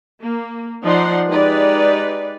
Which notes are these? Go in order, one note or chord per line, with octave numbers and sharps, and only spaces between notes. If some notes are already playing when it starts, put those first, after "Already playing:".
A#3
F3 D#4 D5 F#5 C6
G#3 D#4 G4 B4 D5